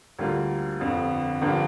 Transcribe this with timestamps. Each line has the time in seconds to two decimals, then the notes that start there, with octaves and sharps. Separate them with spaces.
0.19 D2 D3 G3 A#3 F4
0.80 G1 F2 D3
1.42 G1 G2 D3 F3 A#3